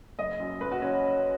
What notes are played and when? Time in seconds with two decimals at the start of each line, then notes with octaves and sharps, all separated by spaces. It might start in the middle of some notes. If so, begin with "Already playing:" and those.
0.18 F#1 D#5
0.40 F#2 F#3
0.61 F#1 B4
0.72 F#4
0.82 C#4